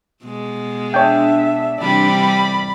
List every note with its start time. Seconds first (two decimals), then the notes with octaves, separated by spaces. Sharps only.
0.23 B2 G#3
0.94 D4 C#5 E5 G5
1.80 C3 E3 G3 D5 B5